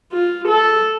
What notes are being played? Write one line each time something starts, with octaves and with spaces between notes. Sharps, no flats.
F4
A4